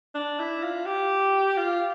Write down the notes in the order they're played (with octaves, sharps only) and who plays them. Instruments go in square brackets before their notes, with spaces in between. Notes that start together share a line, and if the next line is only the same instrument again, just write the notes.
[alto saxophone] D4
E4
F4
G4
F4